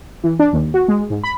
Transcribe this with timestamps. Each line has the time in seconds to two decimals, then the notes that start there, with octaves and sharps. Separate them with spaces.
0.24 E3
0.39 D4
0.53 D#2
0.74 F#4
0.88 G#3
1.10 G#2
1.24 B5